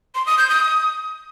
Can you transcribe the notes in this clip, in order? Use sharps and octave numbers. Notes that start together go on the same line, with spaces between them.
C6
D#6
G6
D#6